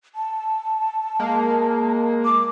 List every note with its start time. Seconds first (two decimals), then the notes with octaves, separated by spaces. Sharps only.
0.15 A5
1.20 G#3 A#3
2.25 D6